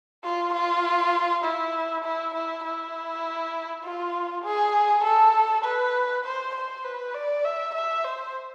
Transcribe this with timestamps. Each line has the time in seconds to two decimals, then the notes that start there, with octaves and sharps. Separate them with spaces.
0.24 F4
0.54 F4
1.44 E4
2.04 E4
2.34 E4
2.64 E4
3.84 F4
4.44 G#4
5.04 A4
5.64 B4
6.24 C5
6.55 C5
6.84 B4
7.14 D5
7.44 E5
7.75 E5
8.04 C5